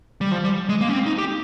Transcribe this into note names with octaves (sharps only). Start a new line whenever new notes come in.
G3
F3
G3
G#3
A#3
C#4
C4
D#4
G4